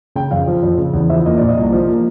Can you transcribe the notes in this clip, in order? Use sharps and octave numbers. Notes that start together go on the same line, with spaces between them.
C#3 G5
F2 F5
F3
F2
C#3
E2
F3 E5
A#3 D#5
A#2 D5
D#5
C2
F3
A#3